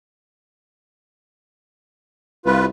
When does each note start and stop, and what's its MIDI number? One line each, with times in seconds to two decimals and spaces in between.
2.46 2.67 36
2.46 2.65 65
2.46 2.65 71